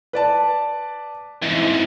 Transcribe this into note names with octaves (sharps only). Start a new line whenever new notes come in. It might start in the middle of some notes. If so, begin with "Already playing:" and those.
B4 D5 A5
F2 G#2 E3